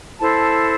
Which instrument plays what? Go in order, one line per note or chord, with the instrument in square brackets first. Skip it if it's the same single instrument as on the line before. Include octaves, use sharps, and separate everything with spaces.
[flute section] E4 A4 C5 A5